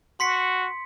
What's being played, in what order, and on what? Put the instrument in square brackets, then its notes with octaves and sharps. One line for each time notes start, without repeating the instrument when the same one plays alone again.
[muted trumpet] F#4 [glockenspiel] C6 B6 C#7